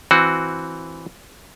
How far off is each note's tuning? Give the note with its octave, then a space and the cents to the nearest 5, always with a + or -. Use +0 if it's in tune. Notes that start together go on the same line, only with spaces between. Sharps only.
E3 +0 C4 +0 F#4 +0